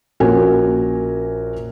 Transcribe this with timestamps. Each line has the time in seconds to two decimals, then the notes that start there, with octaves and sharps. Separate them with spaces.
0.20 A#1 C#4 F#4 A#4 G#5